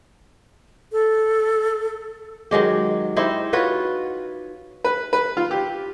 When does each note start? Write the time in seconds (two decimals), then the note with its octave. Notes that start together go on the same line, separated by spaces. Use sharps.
0.92 A4
2.51 D#3 F#3 G#3 G4
3.16 D#4 E4 G4 C5
3.53 F4 F#4 B4 C#5
4.84 B4
5.13 B4
5.37 F4
5.51 G4